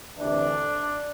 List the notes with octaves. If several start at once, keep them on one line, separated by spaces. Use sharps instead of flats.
D2 C3 E3 D4